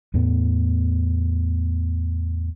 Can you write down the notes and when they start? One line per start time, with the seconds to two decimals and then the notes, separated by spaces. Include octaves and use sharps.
0.14 E2 A2 B3